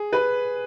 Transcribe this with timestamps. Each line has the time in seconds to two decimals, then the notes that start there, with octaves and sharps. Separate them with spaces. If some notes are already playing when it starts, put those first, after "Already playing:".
Already playing: G#4
0.13 B4